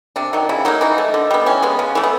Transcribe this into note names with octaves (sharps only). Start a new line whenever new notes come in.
C3 D4
D#3 F#3
C#3 E4
F#3 A#3 D#4
E3 D#4
A3
D3
G3 B3
E3 C#4
G#3 B3
C#3
E3 A3
B3